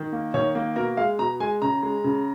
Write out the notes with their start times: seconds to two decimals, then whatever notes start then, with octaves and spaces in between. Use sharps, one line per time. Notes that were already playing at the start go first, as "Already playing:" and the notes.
Already playing: D#3
0.12 A#3
0.34 D#3 C#5
0.55 A#3
0.76 B2 A#4
0.97 G#3 F5
1.19 B2 A#5
1.40 G#3 G#5
1.62 C#3 A#5
1.83 G#3
2.04 C#3